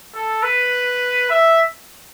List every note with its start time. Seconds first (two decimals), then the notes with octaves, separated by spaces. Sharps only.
0.14 A4
0.43 B4
1.30 E5